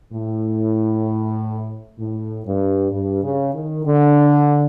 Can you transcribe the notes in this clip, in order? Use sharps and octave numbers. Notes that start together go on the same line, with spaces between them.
A2
A2
G2
G2
C#3
D#3
D3